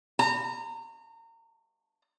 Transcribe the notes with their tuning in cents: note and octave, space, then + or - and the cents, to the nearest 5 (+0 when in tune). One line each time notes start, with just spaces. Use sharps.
A#5 -30